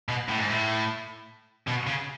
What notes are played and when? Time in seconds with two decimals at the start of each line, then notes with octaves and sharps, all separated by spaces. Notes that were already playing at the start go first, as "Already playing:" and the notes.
0.09 B2
0.28 A2
0.38 G#2
0.48 A2
1.67 B2
1.87 C#3